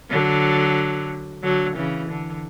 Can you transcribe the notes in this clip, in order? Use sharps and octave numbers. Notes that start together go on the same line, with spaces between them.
D3 F#3
D3 F#3
C#3 E3
D3